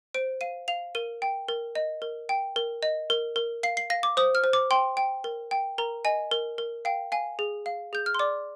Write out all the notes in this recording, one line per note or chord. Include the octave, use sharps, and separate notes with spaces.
C5 D7
F5 D#7
F5 F7
A#4 D#7
G5
A#4
D#5
A#4
G5
A#4
D#5
A#4
A#4
F5 C7
C7
F5 A#6
D6
C5 D#6
F6
C5
D6
G5 C6
G5
A#4
G5
A#4 A#5
D#5 G#5
A#4
A#4
F5 G5
F5 G#5
G#4
F5
G#4 G6
F6
C6
D5 D6